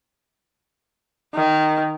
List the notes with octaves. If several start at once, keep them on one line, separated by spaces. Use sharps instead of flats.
D#3